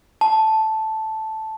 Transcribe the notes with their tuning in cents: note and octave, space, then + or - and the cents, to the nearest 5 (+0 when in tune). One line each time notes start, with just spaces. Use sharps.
A5 -5